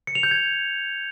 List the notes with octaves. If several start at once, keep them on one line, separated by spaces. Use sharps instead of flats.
C#7
F7
G6
G#6